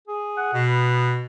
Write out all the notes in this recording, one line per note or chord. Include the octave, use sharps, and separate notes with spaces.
G#4
F#5
B2
B3